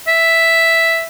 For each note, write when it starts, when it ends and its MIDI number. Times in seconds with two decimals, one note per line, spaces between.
0.08 1.07 76